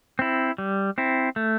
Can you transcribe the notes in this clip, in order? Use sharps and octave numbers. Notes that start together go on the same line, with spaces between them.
C4 E4
G3
C4 E4
A3